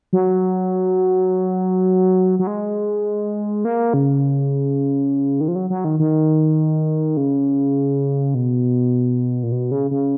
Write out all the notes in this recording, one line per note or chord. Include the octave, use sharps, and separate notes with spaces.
F#3
F#3
G#3
A#3
C#3
D#3
F3
F#3
F#3
D#3
D#3
C#3
B2
A#2
B2
C#3
C#3